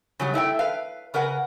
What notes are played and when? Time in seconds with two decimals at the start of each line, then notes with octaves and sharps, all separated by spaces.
0.20 C#3 F#3 G3
0.34 A3 E4 C#5 G5
0.59 B4 F5
1.14 C#3 A#4 B4 F#5